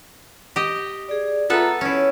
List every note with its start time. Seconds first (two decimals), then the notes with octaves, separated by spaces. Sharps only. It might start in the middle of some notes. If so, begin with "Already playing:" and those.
0.56 G4 D#5
1.09 G#4 D5
1.50 B3 F4 A4 B4 E5 A#5
1.81 C#4 E4 C#5